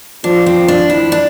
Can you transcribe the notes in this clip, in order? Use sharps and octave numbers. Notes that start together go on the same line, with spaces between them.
F3 D4
C4
D4
E4
D4